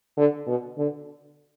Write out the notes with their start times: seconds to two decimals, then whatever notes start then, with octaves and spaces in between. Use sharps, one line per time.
0.17 D3
0.47 B2
0.78 D3